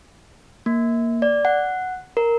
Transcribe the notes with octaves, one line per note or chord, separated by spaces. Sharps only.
A#3
D5
F#5
A#4